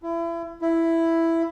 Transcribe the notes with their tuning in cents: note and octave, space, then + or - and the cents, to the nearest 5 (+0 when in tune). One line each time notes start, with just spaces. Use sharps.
E4 +30
E4 +5